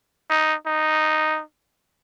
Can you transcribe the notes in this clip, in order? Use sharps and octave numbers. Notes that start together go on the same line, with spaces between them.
D#4
D#4